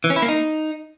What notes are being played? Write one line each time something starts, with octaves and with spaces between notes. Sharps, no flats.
E3
C#4
E4
A#3
D#4